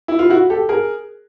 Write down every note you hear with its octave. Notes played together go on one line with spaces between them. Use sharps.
E4
F4
E4 F#4
G4 A4
G#4 A#4